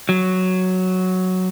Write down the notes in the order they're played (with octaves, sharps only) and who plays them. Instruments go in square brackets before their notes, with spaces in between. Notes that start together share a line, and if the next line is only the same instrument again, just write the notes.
[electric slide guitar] F#3